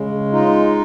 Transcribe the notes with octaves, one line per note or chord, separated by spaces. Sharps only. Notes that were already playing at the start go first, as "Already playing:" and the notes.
Already playing: C#3 G#3
D#4 F4